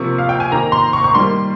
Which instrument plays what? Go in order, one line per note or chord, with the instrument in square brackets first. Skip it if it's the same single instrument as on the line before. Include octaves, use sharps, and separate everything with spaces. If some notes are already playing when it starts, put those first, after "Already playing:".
Already playing: [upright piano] C3 F3 A#3 C#6
F5
G5
G#5
D#3 A#3 A#5
C6
C#6
C#6
D#3 G3 A#3 C6